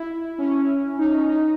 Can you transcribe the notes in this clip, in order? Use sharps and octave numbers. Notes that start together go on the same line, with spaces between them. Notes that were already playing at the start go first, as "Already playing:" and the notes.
Already playing: E4
C#4
D#4
C#4
D#4